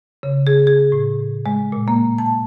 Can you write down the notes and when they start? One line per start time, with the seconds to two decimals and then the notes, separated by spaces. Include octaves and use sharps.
0.23 C#3
0.47 G#4
0.67 G#4
0.92 A2
1.46 G#3
1.72 A#2
1.88 A#3
2.18 A5